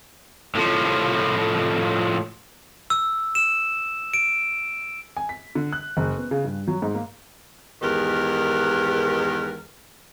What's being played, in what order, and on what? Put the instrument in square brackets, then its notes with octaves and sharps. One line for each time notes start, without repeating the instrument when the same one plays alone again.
[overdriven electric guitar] A2 F3
[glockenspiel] E6
E7
D7
[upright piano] G#5
B6
D3
F#6
F#1
B3
C#3
G2
F#3
G#2
A#3
[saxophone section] E2 G#2 D#3 G4 A#4 B4